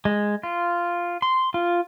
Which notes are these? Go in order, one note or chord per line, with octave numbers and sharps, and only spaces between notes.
G#3
F4
C6
F4